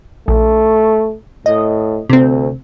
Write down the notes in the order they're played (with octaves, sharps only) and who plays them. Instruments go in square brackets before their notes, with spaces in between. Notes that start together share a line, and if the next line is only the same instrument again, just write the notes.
[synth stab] A#1 [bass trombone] A3
[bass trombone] A2 [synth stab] D#5
[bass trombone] D2 [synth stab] C3 C4